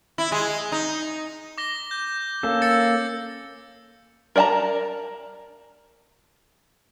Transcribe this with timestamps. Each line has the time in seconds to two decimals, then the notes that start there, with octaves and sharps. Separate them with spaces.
0.18 E4
0.32 G#3
0.72 D#4
1.58 D6 A#6 G7
1.91 G6
2.43 A#3 C#4 A4
2.62 E6 A6 C#7
4.36 A#4 D5 G5 A5 A#5